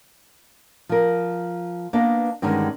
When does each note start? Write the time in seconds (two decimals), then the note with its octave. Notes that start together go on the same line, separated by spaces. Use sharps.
0.89 F3 A#4
1.93 A#3 B3 D4 B4 D#5
2.42 G2 D3 D#3 G3 G#3 C#4